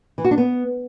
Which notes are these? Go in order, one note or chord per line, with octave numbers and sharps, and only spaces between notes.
E3
F#4
D4
B3